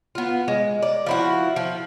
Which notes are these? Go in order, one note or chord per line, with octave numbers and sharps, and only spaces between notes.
B3 F4
G#3
D5
F3 E4 F#4
F3